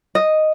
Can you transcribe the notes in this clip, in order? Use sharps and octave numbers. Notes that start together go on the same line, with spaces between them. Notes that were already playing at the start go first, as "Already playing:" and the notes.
D#5